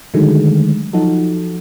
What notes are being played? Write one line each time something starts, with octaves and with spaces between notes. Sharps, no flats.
D3 D#3 F#3 G#3 A3
F3 F#3 D#4 F#4 A4